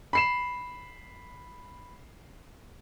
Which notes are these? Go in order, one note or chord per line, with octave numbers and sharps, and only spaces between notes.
B5 C7 E7